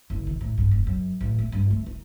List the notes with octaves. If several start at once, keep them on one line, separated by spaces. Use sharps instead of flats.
F#1
D#3
A2
G2
F1
F#2
A1
A3
G2
A3
D#4